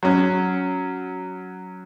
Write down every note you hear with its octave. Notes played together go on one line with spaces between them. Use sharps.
F#3 C#4